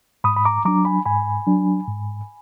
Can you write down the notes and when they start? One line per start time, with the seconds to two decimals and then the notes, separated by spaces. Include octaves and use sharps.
0.24 G#2 B5 D#6
0.36 B5
0.45 A#5 D6
0.65 F#3 D4 A#5 D6
0.85 G#5 B5
1.05 G#2 G#5 B5
1.47 F#3 D4
1.88 G#2